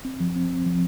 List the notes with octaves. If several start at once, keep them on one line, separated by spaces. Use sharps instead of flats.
C4
F3
C4
C4
F3